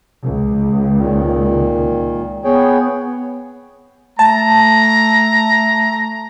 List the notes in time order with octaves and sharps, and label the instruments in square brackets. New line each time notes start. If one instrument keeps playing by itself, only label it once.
[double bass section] C#2
[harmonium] A#2 D#3
[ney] B3 [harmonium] G#4 C#5 G5
[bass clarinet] A3 [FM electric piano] A5 [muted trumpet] A#5